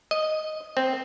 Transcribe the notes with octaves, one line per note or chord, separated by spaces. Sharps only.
D#5
C4